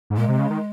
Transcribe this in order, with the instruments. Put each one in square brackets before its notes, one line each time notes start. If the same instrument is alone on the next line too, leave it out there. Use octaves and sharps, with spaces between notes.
[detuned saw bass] G#2
[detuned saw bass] A#2 [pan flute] G#3
[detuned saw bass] C3
C#3
D#3